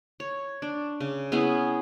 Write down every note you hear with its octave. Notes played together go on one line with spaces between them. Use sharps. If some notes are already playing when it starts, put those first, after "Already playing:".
C#5
D4
C#3
B3 C#4 E4 G#4